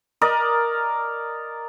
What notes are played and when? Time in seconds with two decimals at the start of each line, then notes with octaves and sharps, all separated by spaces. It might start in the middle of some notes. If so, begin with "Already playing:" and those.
0.21 A#4 D5 D#5